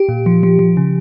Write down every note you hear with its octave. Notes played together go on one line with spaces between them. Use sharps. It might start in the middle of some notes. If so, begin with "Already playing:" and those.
Already playing: G4
A#2
F3
F3
F3
C#3